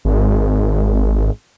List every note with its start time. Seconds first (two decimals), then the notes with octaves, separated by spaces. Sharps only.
0.05 G#1